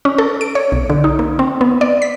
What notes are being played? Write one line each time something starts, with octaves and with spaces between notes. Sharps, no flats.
C#4
A4
D7
C#5
B1
D3
D#4
A#3
C4
B3
D5
B6